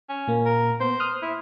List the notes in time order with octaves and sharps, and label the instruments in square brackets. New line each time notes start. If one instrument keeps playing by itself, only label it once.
[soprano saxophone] C#4
[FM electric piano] A#2 A#3
[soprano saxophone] A#4
[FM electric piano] B3 [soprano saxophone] C5
[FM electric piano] D#6 F6 F#6
[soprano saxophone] E4